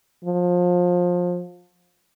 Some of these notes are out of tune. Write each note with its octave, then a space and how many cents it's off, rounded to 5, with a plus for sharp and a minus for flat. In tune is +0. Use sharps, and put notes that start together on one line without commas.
F3 +25